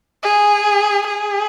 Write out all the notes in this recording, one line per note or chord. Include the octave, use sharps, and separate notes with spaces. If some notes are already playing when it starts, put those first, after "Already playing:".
G#4
G#4